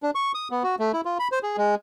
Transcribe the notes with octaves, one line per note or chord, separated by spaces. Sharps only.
D4
C#6
D#6
B3
F#4
A3
E4
F4
B5
C5
G#4
G#3